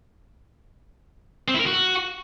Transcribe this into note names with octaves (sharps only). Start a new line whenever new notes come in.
C4
E4
A#4
F#4